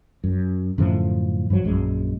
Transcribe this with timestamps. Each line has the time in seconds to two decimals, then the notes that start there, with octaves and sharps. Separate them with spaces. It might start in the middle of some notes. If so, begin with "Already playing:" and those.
0.24 F#2
0.78 F#2 A2 D3 F3
1.50 G2 F3 F#3
1.65 A#1 F#2 G#3